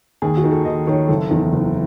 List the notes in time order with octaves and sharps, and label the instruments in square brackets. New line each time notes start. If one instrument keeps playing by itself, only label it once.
[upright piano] D#2 G#4
F#4
D#3
A4
D#2 D#5
D#3 C#5
F#1 A4
E2 D#3
F#1